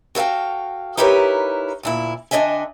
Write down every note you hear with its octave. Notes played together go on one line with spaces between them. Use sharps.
F#4 A4 A#4 F5 G5
D#4 E4 G4 A#4 B4 C#5
D2 A#2 E4
F2 D3 D4 D#5 E5 G#5